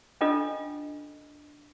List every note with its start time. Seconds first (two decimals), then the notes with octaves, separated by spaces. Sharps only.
0.21 C#4 D4 F4 A4 D#5